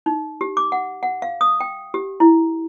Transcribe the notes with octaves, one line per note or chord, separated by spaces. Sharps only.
D#4
G4
D6
F#5
F#5
F5
D#6
G5
G4
E4